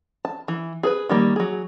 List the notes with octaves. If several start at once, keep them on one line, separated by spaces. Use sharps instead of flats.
A5
E3
G#4 A4 B4
D#3 G3 A#3
F#3 G#4